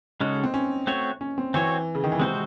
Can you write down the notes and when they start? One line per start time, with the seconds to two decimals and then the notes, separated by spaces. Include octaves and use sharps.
0.20 C#3 G#3 C#4 D#4 F#4 A4
0.43 C4
0.54 C#4
0.87 A3 C4 F#4 C#5
1.21 C#4
1.38 C4
1.54 E3 C4 F#4 C#5
1.95 C#3
2.04 D#3
2.12 E3
2.20 C3 G#3 C4 F#4 C5